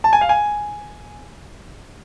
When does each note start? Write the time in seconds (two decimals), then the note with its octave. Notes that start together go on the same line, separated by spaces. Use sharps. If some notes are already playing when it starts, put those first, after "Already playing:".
0.04 A5
0.13 G#5
0.21 F5
0.29 G#5